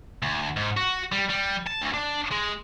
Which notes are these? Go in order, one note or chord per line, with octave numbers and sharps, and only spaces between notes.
D2
G#2
F#4
G3
G3
A5
D2
D4
G#3